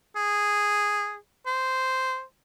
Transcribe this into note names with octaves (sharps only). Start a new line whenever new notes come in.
G#4
C5